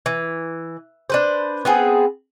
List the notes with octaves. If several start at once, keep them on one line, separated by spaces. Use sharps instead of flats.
E3
D4 B4 C5
B3 C4 G#4